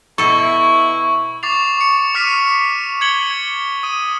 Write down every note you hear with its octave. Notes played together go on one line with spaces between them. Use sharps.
B2 E4 A4 C#6
C#6 D6 A6 C7 F7
C#6 C#7
D6 F6 B6 C#7 D#7
G#6 C#7 F#7 G7
D#6 D#7